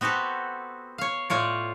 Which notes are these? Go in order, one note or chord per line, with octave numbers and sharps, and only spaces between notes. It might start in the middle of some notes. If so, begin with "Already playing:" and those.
B3 C4 F#4 G4 A4
C#5 F5
A2 F4 C#5 D5